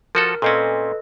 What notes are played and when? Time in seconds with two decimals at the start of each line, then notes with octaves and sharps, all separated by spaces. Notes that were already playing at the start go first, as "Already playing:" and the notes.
0.15 F3 F#4 A4 A#4
0.42 A#2 C4 C#4 A4 B4 D#5